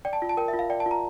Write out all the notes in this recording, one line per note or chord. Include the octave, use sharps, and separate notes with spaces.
D5 G5
A5
F4
A5
A#4 G5
E5
F4
F5
D5 G5
A5
F4
A#5